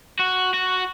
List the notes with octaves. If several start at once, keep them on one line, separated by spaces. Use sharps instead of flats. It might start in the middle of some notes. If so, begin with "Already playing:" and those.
F#4
F#4